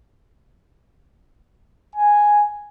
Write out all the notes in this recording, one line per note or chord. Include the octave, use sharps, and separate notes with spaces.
G#5